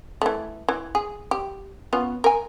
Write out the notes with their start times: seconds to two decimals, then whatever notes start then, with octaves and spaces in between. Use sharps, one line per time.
0.22 E3 A3
0.69 E3
0.95 G#4
1.31 G4
1.93 B3 C#4 F4
2.24 A#4 G#5